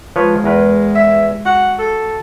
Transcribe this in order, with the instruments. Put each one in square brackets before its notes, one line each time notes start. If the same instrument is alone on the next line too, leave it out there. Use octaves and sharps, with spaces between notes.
[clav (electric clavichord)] F3 B4 C#5 [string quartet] G#3
[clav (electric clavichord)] E2 A#4 B4
[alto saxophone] E5
[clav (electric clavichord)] F#4 [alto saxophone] F#5
[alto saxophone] A4